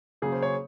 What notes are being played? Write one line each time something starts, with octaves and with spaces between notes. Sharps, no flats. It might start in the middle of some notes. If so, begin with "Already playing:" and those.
C#3 F#3 A#3 G#4
C5
C#5